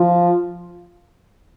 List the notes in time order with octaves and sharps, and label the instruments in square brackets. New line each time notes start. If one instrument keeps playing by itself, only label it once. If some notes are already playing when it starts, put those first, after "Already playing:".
Already playing: [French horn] F3